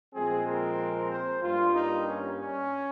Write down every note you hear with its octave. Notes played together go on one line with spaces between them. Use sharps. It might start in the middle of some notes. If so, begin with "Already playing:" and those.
A#2 F3 G#3 C4 G#4
A#4
C5
G2 G3 A#3 F4
D#4
C#4
C#4